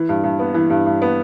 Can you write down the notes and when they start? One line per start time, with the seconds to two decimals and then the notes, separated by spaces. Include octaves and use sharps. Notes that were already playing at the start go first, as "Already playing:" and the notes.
Already playing: E3
0.09 G2
0.24 G2
0.39 B3
0.54 E3
0.70 G2
0.86 G2
1.02 B3